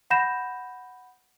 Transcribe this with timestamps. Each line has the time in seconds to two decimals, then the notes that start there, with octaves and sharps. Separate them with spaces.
0.10 F#5 B5 G6 A#6 E7